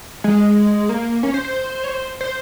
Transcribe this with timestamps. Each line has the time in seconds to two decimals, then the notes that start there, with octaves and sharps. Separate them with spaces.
0.24 G#3
0.89 A#3
1.23 C#4
1.34 C5
1.45 C5
1.84 C#5
1.88 C5
2.21 C5